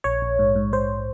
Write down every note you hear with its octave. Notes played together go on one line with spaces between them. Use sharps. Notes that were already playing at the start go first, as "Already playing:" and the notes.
A#1 C#5
A#1
G#2
G#2
G#2 C5